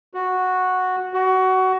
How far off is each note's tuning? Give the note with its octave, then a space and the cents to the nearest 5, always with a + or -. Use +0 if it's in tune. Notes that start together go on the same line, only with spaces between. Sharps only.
F#4 -5
F#4 +20